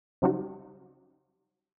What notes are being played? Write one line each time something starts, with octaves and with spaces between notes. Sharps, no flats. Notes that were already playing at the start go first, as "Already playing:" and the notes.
C#3 F#3 G3 D#4 F#4